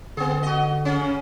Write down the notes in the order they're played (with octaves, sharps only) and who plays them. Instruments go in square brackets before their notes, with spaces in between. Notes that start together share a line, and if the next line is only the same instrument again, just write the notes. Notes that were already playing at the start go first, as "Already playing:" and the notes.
[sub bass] D3 [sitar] B3 G#4
[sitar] F#4 D#5
C#3 C#4